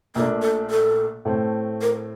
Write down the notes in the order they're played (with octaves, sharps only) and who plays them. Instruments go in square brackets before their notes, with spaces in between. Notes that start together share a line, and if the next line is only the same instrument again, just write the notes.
[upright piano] A#1 A#2 A3 D4 [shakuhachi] A#3
[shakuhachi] A4
A4
[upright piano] A2 A3 C4
[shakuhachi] A#4